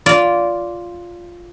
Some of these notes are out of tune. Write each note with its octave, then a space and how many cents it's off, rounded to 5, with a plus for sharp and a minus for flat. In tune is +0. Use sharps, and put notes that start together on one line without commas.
F4 +0 D5 -20